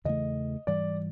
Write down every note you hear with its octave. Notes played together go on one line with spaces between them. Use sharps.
E2 C#3 E3 A3 D#5
G#2 E3 G3 D5